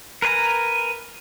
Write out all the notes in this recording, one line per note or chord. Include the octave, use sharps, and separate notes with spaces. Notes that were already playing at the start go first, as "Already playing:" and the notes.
A#4 B4 C#5 G#5 A#5